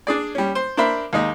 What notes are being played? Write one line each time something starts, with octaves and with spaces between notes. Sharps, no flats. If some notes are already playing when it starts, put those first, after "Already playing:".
D4 G#4 D5
G3 C#4
C5
D4 A#4 C5 E5 B5
D#2 G#3 D#4